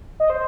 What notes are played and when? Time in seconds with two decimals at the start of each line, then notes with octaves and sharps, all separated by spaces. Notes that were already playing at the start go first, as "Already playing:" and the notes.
0.20 D#5
0.30 C5